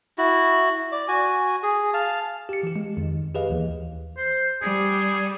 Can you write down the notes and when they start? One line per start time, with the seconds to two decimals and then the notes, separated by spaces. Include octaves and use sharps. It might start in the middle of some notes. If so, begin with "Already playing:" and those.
0.18 E4 F#4
0.92 D5
1.08 F#4 G#5
1.63 G#4
1.94 F5 A5
2.49 G4 C#7
2.63 E3 G4
2.76 G#3
2.97 F2 D#3
3.34 G4 G#4 B4 D#5 F5
3.50 D#2 E3
4.18 C5
4.62 G3 G#4